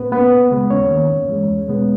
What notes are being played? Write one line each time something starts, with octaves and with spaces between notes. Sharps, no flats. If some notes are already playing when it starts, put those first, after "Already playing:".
Already playing: A#2 B3 B4
A#3 B3 C#4 B4
C#2
C#3 G#3 B3
D#2 C#4 C#5
D#3 A#3
G2
E3 G#3
E2
B2 G#3 B3